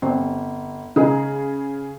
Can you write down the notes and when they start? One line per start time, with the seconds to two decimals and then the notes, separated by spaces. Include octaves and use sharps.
0.02 G1 C4
0.96 C#3 D#4 G#4